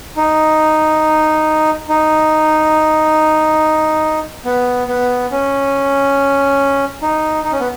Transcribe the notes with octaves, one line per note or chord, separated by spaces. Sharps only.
D#4
D#4
B3
B3
C#4
D#4
D#4
C#4
B3